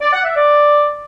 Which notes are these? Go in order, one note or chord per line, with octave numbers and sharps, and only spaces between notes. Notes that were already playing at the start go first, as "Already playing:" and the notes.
D5
F#5
E5
D5